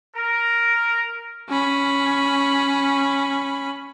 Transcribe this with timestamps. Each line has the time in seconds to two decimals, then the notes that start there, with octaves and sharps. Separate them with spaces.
0.16 A#4
1.49 C#4 B5